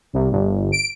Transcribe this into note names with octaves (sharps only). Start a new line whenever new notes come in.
C2
G1
D7